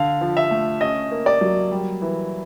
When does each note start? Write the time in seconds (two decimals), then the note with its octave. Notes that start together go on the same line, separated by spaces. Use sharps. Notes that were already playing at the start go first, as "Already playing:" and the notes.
Already playing: D3 F5
0.21 F3
0.37 E5
0.51 A3
0.81 C#4 D#5
1.11 A#3
1.26 D5
1.41 F#3
1.71 G3
2.02 E3